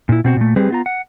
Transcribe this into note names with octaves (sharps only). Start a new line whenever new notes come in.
A#2 E4
B2 C4 F#4
A#2 A3
G3 C4 G4 G#4 B4
B3 F4 A#5
F#5